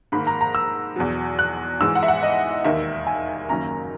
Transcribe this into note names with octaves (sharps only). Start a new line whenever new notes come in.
G#2 D#3 A#3 B5
A#5
A#5
E6
E2 B2 F#3
F#6
G#2 E3 G#3 E6
F#5
E5
F#5
D#5
E1 D#2 D#3 E5
G#5
F#1 F#2 D#3 A#3 C#4 A#5